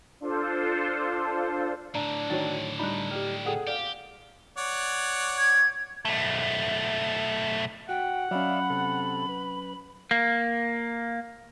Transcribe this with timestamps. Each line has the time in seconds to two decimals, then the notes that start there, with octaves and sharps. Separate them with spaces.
0.20 D4 F4 A4 C5
1.95 A2 D3 D4 A#5
2.30 D#3 F#3 C#5 A6
2.79 G3 D4 D#4 B5 F#6
3.11 G3 G4 F6
3.46 G#4 A4 F#5 G5
3.67 G4 D5 F5
4.58 C#5 D5 F#5
5.39 G#6
6.05 B1 A3
7.89 F#4 F#5 G5
8.31 F#3 C#4 D5 E5 F5 B5
8.70 C3 A4
9.29 B4
10.11 A#3